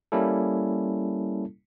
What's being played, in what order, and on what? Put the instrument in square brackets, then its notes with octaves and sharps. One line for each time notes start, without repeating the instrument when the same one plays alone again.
[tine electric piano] G3 A#3 C#4 E4 A4